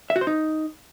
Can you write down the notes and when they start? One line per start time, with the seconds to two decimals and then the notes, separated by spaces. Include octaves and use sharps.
0.10 E5
0.16 F#4
0.21 C5
0.27 D#4